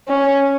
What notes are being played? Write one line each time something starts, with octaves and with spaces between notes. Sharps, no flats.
C#4